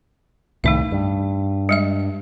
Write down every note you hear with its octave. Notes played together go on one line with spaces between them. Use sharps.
C2 A2 D#3 A3 D#4 E5
G2
G3 G#3 E5